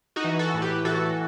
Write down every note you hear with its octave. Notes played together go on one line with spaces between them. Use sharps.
D#4 F#4
E3
F#4 A4
A2
G4 B4
E3 F#4 A4